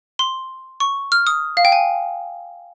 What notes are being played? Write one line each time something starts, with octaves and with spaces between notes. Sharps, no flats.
C6
C#6
F6
D#6
F5
G5
G#5